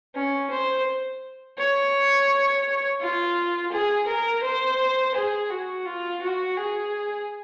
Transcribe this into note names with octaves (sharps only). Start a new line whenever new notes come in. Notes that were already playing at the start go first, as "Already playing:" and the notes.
C#4
C5
C#5
F4
G#4
A#4
C5
G#4
F#4
F4
F#4
G#4